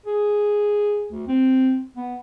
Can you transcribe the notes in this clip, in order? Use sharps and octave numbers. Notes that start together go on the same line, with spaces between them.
G#4
D2
C4
B3